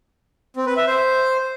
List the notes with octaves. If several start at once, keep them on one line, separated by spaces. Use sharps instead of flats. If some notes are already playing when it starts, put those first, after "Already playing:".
C4
B4
E5
C5